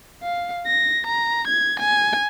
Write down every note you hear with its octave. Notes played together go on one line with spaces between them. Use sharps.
F5
A#6
A#5
G#6
G#5